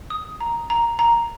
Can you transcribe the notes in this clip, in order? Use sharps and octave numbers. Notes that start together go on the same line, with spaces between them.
D#6
A#5
A#5
A#5